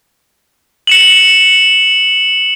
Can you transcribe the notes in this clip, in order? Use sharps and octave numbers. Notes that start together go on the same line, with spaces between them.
C#7 E7 F#7